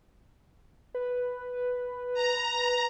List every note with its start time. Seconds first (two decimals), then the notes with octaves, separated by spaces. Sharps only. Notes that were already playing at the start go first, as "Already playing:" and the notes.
0.95 B4
2.14 A#5